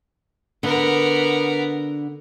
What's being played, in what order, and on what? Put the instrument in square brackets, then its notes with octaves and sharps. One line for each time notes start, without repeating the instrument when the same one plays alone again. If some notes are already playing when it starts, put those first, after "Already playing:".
[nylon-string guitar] D3 [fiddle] B3 A#4